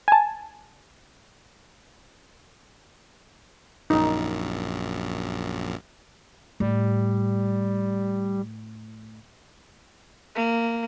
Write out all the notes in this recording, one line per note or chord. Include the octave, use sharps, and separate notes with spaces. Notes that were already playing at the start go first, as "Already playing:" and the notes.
G#5 A5
A#1 F#2 D#4
A2 G3
A#3